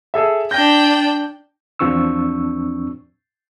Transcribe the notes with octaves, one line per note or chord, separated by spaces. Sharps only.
G#4 A4 E5
D4 G5 G6 A#6
E2 F3 C4 D4 C#6 E6